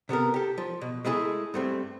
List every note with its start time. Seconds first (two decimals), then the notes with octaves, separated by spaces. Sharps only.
0.09 C3 B3 A4 A#4
0.34 G4 A4
0.58 F3
0.81 B2
1.05 G#3 A3 E4 G#4
1.54 G2 A3 C4